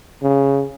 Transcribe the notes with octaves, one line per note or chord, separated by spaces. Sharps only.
C#3